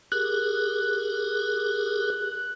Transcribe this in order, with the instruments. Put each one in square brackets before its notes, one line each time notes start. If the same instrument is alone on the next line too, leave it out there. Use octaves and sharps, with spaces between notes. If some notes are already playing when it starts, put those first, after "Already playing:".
[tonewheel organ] G4 G#4 A#4 [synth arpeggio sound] F#6